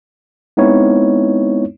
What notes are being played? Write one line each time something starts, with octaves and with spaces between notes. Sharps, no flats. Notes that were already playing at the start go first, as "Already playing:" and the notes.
G#3 B3 C4 D#4 E4 C#5